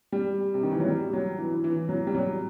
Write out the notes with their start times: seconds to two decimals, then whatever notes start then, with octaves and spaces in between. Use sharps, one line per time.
0.12 G3
0.54 C3
0.63 D#3
0.71 E3
0.80 F#3
0.88 G3
1.13 F#3
1.39 E3
1.51 E3
1.64 E3
1.76 E3
1.89 F#3
2.07 G3
2.15 F#3